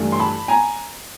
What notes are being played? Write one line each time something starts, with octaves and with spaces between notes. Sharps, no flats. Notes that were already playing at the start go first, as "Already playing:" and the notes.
Already playing: G2 E3 A3
C6
A5 B5
G#5 A#5